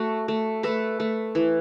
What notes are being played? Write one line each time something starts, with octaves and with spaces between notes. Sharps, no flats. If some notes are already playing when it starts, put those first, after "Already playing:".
Already playing: A3 F#4
A3
A3 A4 B4
A3
E3